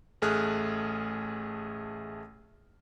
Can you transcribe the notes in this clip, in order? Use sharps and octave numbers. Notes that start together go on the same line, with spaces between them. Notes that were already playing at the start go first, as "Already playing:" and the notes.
A1 A3 G#4 F6 F#6